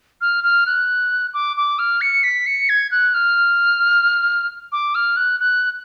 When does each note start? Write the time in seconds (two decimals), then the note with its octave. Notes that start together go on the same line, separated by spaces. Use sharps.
0.21 F6
0.44 F6
0.66 F#6
1.34 D6
1.57 D6
1.79 F6
2.01 C#7
2.24 B6
2.46 C#7
2.69 G#6
2.91 F#6
3.14 F6
4.72 D6
4.95 F6
5.17 F#6
5.40 F#6